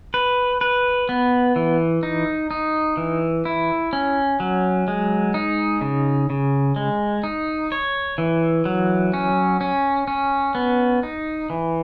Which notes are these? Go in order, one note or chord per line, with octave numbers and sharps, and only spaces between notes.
B4
B4
B3
E3
D#4
D#4
E3
E4
C#4
F#3
G#3
D#4
C#3
C#3
G#3
D#4
C#5
E3
F#3
C#4
C#4
C#4
B3
D#4
E3